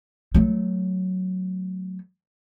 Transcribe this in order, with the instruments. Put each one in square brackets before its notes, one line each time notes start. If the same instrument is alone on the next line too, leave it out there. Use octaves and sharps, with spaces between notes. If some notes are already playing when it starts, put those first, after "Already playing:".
[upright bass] F#3 A3